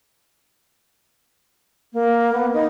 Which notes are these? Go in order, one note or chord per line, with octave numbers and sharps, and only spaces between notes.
A#3
B3
D#4